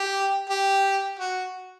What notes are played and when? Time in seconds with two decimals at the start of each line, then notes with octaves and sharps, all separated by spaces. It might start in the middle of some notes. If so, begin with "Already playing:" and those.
Already playing: G4
0.50 G4
1.19 F#4